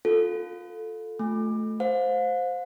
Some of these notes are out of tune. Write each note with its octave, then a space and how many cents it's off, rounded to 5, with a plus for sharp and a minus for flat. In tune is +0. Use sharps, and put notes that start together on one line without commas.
F4 +25 A4 +0
A3 -15 G#5 -15
C5 +0 F5 +40